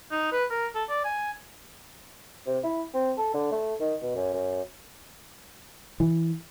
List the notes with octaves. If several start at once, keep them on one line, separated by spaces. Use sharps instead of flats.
D#4
B4
A#4
A4
D5
G#5
C3
E4
C4
A4
D3
A3
D#3
B2
F#2
F#2
E3